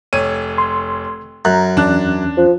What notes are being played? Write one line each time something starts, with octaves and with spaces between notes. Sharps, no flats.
F1 C#5 D#7
C6
F#2 A#5 F#6
E2 C#4 D4 F#6
F3